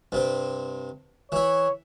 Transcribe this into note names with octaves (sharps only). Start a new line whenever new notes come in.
G2 C3 C4
E3 E4 C#5